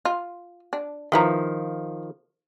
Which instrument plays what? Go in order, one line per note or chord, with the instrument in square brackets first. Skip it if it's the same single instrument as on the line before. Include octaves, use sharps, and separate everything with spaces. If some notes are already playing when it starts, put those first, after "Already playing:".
[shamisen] F4
D4
[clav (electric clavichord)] D#3 F3 [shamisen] E4 B4 A#5